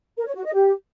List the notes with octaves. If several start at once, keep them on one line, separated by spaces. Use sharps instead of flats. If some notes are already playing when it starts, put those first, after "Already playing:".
A#4
C#5
F#4
D#5
G4